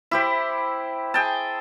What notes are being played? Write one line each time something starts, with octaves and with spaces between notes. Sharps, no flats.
E4 G4 C5
G#4 G5 A5